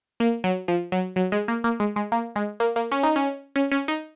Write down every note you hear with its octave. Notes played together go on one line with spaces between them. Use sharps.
A#3
F#3
F3
F#3
F#3
G#3
A#3
A#3
G#3
G#3
A#3
G#3
A#3
A#3
C#4
D#4
C#4
C#4
C#4
D#4